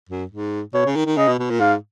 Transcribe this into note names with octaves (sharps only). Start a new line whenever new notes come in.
F#2
G#2
B2 C#5
C#3
D#3
D#3
C#3 D#5
B2
B2
A#2
G#2 F5